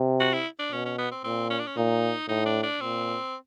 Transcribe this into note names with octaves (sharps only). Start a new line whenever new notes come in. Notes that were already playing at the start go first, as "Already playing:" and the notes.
Already playing: C3
F#4
E4
D4
B2 C#4
C#4
B3
C4
A#2 C4
C#4
D4
C#4
A#2 D#4
A2 D#4
D4
D4
A#2 C4